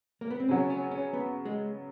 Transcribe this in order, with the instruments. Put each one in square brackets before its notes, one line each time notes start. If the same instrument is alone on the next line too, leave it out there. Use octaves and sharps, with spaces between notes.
[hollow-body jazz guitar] A#3
B3
C4
[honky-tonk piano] C#3 F#3 B3 [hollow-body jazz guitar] C#4
[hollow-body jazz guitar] C#4
C#4
B3
G#3